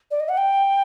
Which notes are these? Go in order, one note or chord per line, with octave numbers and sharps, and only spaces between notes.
D5
D#5
F#5
G5